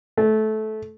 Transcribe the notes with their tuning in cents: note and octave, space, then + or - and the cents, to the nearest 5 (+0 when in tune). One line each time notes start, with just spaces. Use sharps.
A3 -20